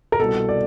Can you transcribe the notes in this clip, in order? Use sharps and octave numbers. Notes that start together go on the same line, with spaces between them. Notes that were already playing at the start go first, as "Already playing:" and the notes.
A#4
C2 B2 A4
D5